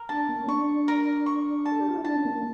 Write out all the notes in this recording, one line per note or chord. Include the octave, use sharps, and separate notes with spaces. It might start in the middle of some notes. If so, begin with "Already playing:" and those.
Already playing: A#4
D4 A5
A#3
C#4
D4 C#6
A#4
C#6
A5
A4
G4
F4
E4
D4 A5
C#4
A#3